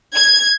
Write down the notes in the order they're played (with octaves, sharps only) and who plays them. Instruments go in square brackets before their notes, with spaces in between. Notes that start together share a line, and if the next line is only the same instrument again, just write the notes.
[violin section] G#6